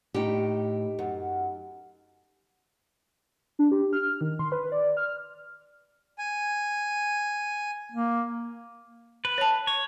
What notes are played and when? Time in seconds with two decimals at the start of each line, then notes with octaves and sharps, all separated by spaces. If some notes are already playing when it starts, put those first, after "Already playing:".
0.14 A2 D#4 G4
0.99 F#2
3.59 D4
3.71 G4
3.93 F6
4.21 D#3
4.39 C6
4.52 B4
4.72 D5
4.97 F6
6.18 G#5
7.92 A#3
9.25 B4
9.38 C#5 A5
9.67 C#5